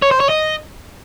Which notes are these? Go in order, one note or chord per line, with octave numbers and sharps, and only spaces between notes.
C#5
C5
C#5
D#5